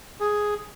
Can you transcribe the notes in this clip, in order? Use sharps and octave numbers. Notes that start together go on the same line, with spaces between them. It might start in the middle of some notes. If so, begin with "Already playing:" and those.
G#4